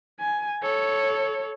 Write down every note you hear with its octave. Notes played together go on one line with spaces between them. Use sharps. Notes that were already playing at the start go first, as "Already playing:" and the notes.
G#5
A4 C#5